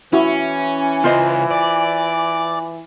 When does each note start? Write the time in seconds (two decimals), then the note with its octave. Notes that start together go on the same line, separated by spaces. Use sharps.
0.13 E3 C#4 E4 F#4
1.04 C#2 F4 C5 D#5
1.51 D5